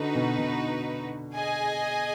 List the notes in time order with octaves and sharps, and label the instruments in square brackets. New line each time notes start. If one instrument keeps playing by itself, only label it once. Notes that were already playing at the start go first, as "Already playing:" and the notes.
Already playing: [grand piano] D3 [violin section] D#4 F#4 B4
[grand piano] B2
B2
[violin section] G#4 D#5 G#5